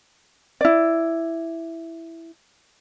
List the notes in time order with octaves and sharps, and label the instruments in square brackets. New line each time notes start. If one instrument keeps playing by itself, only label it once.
[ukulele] E4 D5